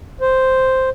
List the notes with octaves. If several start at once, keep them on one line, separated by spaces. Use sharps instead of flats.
C5